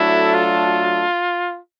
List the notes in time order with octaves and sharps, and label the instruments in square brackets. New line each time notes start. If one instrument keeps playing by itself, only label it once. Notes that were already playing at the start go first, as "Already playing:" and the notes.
Already playing: [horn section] F#3 A3 D4 F#4 A4 [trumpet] E4
[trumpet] F4